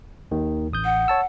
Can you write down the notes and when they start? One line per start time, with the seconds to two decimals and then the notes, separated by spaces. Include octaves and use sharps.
0.32 D#2 D#3
0.72 A1 D#6 G6
0.85 F#5
1.08 C#5 A5 E6